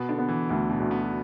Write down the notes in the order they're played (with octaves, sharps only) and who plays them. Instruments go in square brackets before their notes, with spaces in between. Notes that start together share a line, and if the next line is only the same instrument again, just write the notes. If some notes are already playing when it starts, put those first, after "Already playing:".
Already playing: [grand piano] B2 [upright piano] B3
[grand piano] D3
[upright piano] B3
[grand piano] E3
[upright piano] D2 [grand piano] D3
[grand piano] B2
[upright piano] D2
[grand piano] B3